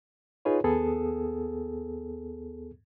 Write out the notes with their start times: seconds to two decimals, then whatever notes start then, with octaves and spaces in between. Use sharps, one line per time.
0.45 D#4 F4 G#4 B4 C#5
0.64 D#2 B3 G#4 A4